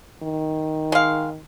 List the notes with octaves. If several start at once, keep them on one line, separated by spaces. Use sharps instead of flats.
D#3
G#3 F5